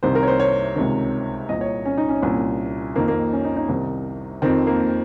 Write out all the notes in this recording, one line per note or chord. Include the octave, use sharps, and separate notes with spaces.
C2 C3 D#3 C5
A#4
C#5
C5
C#5
C#2 C3 D#3
C2 A#2 D#5
C#5
C#4
D#4
C#4
C2 A#2
F2 D#3 A#3
A#3
C#4
D#4
D#4
C2 C3 D#3
F2 D#3 C4
A#3